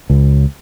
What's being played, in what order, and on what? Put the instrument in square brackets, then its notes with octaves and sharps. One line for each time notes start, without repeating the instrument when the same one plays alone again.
[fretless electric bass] C#2